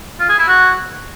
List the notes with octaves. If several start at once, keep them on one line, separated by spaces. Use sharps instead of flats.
F4
G#4
E4
F#4